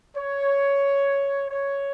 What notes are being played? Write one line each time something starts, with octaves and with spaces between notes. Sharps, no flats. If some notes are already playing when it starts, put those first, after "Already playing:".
C#5
C#5